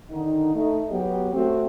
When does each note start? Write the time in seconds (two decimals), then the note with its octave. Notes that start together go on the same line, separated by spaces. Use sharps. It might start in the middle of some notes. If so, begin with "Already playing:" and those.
0.11 D3 D#3 D#4
0.54 A3 D#4
0.91 F#3 B3 G4
1.34 A3 C4 F#4